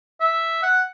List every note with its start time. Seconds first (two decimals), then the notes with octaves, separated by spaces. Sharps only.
0.20 E5
0.62 F#5